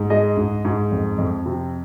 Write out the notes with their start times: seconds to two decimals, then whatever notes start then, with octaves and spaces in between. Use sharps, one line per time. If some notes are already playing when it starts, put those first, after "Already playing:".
Already playing: G#2
0.10 G#3 D#5
0.37 G#2
0.65 G#2
0.92 F2
1.18 F2
1.46 C3